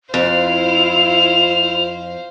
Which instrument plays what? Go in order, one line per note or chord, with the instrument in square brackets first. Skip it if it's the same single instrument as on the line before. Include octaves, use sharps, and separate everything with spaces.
[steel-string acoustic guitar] F2 [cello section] E4 F4 [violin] C5 F5 [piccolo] F7